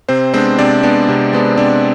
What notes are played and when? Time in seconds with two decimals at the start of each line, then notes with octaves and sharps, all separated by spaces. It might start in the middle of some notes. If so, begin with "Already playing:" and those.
0.09 C3 C4 C5
0.34 G#3 B3 C4 D4 C5
0.58 C3 D4 D5
0.83 G#3 B3 D4
1.09 C3
1.33 G#3 B3 D4
1.57 C3 D4 D5